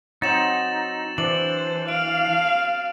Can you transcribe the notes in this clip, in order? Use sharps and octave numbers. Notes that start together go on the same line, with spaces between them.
F#3 C4 D#4 A6 E7 F#7
E3 D4 C5 F#7
F5 D7